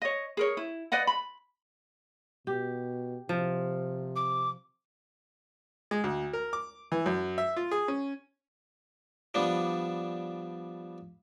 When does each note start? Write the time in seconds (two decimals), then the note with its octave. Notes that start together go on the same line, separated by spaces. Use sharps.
0.02 C#5 D#5
0.37 G#4 A#4 C#5
0.57 E4
0.92 B4 D5 D#5 F#5
1.07 B5
2.47 B2 G4
3.29 C3 F3
4.16 D6
5.91 G#3
6.04 D2
6.33 A#4
6.53 D6
6.92 E3
7.06 F#2
7.38 E5
7.56 F4
7.71 G#4
7.88 C#4
9.34 F3 G3 B3 D4